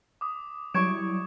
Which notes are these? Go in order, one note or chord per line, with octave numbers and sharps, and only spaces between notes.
D6 D#6
F#3 G3 E4 C#6 G#6 D7 E7